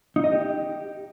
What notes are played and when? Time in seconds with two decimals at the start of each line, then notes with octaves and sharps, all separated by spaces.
0.16 D#4
0.24 D#5
0.32 G4